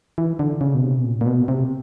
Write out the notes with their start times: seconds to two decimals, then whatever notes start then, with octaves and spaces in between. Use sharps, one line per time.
0.18 E3
0.39 D3
0.61 C#3
0.75 B2
0.83 C3
0.97 B2
1.05 A#2
1.21 A#2
1.26 B2
1.48 C3